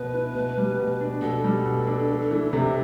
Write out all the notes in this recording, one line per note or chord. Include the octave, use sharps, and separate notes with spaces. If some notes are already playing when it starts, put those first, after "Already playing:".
Already playing: B2 B3 B4
E4
B2
G3
B2
D4
B2 A4
G3
B2
D4
D4
E3
C3